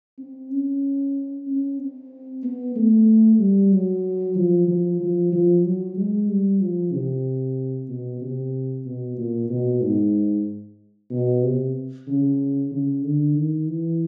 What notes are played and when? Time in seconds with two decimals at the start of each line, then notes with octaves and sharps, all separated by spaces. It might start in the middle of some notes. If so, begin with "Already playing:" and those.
0.18 C4
0.50 C#4
1.47 C#4
1.79 C4
2.43 B3
2.76 A3
3.39 G3
3.72 F#3
4.36 F3
4.68 F3
5.00 F3
5.32 F3
5.64 F#3
5.97 G#3
6.29 G3
6.61 F3
6.93 C3
7.89 B2
8.21 C3
8.85 B2
9.18 A#2
9.50 B2
9.82 G#2
11.11 B2
11.43 C3
12.07 C#3
12.71 C#3
13.03 D3
13.35 D#3
13.68 E3